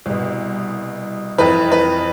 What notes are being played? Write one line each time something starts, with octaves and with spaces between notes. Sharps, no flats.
C2 B2
F2 E3 B4
B4